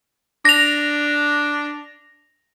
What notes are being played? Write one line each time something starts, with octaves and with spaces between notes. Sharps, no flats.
D4 A#6 F7